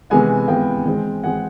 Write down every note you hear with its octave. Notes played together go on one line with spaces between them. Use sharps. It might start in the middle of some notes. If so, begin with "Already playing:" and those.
C3 E3 G#3 B3 F#5 G#5
C3 E3 G#3 B3 F5 G5
E3 G#3 C4
E3 G#3 C4 F#5 G#5